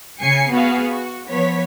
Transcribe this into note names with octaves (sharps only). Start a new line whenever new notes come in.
C#3 G#5 C7 C#7
B3 F#4 G#4 F5
F#4
F3 B3 C#5 B6